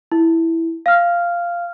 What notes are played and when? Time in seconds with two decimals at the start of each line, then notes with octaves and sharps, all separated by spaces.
0.12 E4
0.86 F5 F6